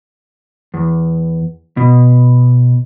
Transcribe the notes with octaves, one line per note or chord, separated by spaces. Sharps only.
E2
B2